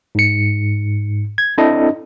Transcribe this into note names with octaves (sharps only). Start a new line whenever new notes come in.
G#2 C#7
G#6
C4 D4 E4 A4 D#5